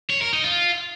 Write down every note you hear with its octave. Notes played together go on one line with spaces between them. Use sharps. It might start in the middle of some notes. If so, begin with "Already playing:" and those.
C#5
A#4
D#4
F4